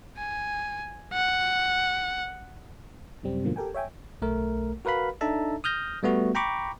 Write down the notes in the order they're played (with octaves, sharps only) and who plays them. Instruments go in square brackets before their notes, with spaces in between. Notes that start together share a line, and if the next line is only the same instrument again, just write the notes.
[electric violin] G#5
F#5
[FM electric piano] F#2 C3 G3 C4
G#2 B2 D3 F3 A#3
G4 A4 A#4 G5 G#5
C#5 E5 G5 G#5
[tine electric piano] B1 A3 A#4
F#4 A#4 B4 F5 B5
D4 D#4 A4 E5 A5 A#5
D#6 F6 G6 A#6
G3 A3 B3 F#4
G5 A#5 B5 C#6 D6